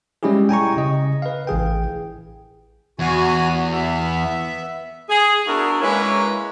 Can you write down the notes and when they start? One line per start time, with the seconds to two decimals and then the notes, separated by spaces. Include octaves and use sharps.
0.23 G3 G#3 C#4 E4 G4 G#4
0.49 G5 G#5 A#5 C#6
0.77 C#3 D#5
1.22 B4 F5
1.47 A1 E3 G#4 G5
2.99 E2 F#4 G#5
3.72 B3 E5
5.09 G#4
5.47 B3 D4 E4 F#4 G#4 A#4
5.81 G#3 A#3 C#4 E4 B4 C#5